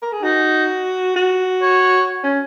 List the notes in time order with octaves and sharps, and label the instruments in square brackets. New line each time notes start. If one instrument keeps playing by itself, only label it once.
[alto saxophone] A#4
G#4
[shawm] D#4 [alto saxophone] F#4
[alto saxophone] F#4
[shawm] C#5
[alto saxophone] C#4